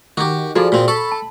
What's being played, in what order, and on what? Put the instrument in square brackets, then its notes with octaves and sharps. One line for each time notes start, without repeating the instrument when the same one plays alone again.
[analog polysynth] D#3 [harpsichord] F#4 G4
[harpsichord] F3 [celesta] F4 F#4 A4 [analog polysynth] G#4 D5
[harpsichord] A#2 C4 [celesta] F#4
[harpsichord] A4 [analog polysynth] B5 [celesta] C#6
[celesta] A5